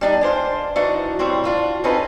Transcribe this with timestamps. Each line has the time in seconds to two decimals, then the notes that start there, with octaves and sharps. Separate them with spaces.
0.01 G3 D4 D#4
0.21 G#3 D4 C5 F5
0.76 E3 D4 D#4 F#4 F#5
1.19 A2 G3 C4 F#4
1.44 D4 F4 F#4
1.84 C4 C#4 D#4 F4 A4 B4